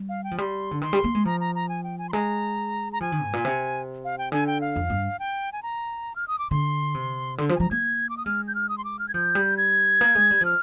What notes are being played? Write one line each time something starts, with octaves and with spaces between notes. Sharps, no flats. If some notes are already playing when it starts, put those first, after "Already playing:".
Already playing: G3
F5
G5
F3
G3 C6
D3
D#3 C6
G3
A#3
G#3
F3 A#5
A#5
A#5
G#5
G5
G#5
C6
G#3 A#5
A#5
F3 G#5
D#3
G#2
A#2
C3
F5
G5
D3 G#5
G5
F5
F2
G2
G5
G#5
A#5
F6
D#6
D6
D3 C6
C3
D3 C6
F3 C6
G#5
F3 A#5
A#3 G#6
D6
D#6
G#3 F6
G6
F6
D#6
C6
D6
F6
G#6
F3 G6
G3
G#6
A#3
G#3
G3
F3 F6